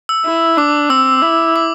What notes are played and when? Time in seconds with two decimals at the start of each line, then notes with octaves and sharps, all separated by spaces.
0.09 E6
0.26 E4
0.57 D4 D6
0.90 C4 E6
1.22 E4
1.56 D6